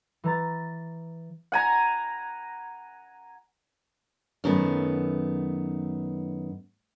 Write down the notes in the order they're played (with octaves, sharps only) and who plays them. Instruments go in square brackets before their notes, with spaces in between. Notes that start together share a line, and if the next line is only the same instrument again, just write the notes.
[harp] E3 A#5 A6
[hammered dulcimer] F#5 G#5 A#5
[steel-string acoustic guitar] F#2 D#3 A3 B3